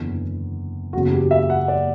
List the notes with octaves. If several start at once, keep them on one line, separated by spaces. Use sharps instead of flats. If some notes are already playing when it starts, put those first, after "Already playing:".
Already playing: F#1 E2 D3
F#1 E2 C#3 F#4
G4
E5
F#5
D5